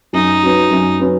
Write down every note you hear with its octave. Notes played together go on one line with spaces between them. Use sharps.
F#2 D#4
F#3 C#4 B4
F#2
F#3 C#4 B4